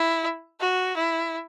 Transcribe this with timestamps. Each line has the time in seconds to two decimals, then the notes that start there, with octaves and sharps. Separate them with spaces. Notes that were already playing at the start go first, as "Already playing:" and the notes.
Already playing: E4
0.60 F#4
0.97 E4